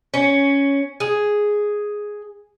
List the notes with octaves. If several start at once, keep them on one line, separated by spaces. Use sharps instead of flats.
C#4
G#4